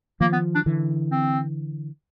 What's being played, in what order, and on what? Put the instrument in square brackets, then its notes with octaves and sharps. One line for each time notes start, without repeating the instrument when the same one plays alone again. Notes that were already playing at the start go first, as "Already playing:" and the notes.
[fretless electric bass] D#3 F3 [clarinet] A#3
[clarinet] B3
D4
[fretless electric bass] D3 E3
[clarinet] C4